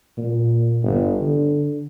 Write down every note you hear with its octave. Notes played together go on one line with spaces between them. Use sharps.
A#2
G1
D3